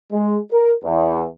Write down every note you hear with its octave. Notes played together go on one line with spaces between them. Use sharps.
G#3
A#4
E2